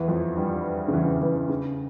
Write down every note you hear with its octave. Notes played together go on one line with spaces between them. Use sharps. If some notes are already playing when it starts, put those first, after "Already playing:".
Already playing: E2 E3
F2 F3
G2 G3
C#3
E2 E3
E2 E3
C#3